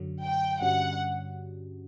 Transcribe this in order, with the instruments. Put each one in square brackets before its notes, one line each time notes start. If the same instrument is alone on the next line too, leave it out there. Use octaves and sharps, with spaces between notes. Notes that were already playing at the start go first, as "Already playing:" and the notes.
Already playing: [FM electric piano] F#2 D3 F#3
[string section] G5
[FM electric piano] G2 D3 G3 C#4 F#4 [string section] F#5